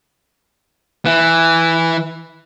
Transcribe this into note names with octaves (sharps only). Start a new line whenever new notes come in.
E3